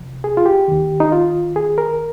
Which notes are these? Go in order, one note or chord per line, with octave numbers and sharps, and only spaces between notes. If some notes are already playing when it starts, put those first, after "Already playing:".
Already playing: C2 C3 F3
G#4
F4
G4
D#2 D#3
D#4
F4
G#4
A#4